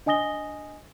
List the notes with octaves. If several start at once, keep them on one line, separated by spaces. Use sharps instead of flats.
D4 D#5 G#5 D#6 A#6 G7